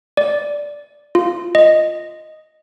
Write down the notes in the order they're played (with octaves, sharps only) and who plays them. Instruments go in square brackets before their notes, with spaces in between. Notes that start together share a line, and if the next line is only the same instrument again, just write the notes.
[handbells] D5
F4
D#5